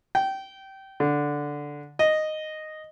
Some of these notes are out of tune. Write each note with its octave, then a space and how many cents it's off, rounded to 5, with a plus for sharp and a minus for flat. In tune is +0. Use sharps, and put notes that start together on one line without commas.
G5 -20
D3 -5
D#5 -5